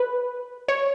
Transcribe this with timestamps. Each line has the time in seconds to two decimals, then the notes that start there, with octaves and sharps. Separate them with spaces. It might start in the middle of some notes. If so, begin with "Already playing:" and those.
Already playing: B4
0.68 C#5